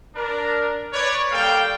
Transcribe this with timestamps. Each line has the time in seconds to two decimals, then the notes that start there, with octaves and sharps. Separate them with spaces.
0.15 D4 A#4
0.93 B4 C#5 D5
1.32 G3 A#3 A4 D5 F5 G5